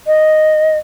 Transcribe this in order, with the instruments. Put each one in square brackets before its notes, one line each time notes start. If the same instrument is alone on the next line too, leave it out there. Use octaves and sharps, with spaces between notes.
[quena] D#5